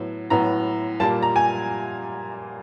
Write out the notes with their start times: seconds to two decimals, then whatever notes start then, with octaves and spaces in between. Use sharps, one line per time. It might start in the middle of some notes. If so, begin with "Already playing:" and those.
Already playing: A2 F#3 B3
0.30 A2 F#3 B3 A#5
1.00 A#2 G3 A#3 A5
1.23 A#5
1.36 G#5